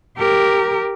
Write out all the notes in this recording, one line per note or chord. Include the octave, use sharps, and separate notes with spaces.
G4 A#4